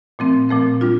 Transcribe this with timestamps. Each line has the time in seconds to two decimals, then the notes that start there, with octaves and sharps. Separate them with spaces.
0.19 A#2 F3 A3 C4
0.49 A#2 F3 A3 C4
0.81 G3 D4 F4